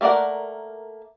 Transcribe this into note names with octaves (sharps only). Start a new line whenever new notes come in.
A3 A#3 A#4 D5 F#5